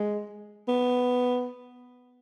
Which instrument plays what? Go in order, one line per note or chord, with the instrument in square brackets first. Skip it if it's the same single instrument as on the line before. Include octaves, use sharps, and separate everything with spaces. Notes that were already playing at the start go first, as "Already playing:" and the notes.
Already playing: [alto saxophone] G#3
B3